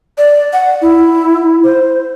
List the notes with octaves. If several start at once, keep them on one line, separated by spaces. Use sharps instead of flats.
D5
F#5
E4
C5